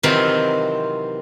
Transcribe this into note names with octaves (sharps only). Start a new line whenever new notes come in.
C3 D#3 E3 F#3 C4 F4